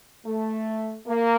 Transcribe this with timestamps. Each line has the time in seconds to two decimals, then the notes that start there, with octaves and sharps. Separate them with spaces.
0.27 A3
1.06 A#3